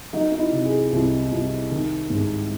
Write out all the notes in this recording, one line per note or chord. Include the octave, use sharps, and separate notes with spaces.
F#3 D#4
D#4
E4
C3
G#4
C2
C2
D#3
G#2